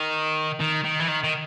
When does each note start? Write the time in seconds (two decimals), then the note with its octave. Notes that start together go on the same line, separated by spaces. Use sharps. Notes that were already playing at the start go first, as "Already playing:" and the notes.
Already playing: D#3
0.60 D#3
0.84 D#3
1.00 E3
1.08 D#3
1.24 D#3